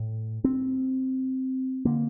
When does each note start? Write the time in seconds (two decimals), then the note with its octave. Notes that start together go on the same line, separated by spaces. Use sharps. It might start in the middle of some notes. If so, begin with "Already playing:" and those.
Already playing: A2
0.44 C4
1.85 D3 A#3